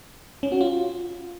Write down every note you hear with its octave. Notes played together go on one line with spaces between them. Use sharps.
C#4
F#4
F4